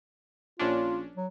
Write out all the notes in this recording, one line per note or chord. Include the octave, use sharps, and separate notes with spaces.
A#1 C#4 D4 F4
F#3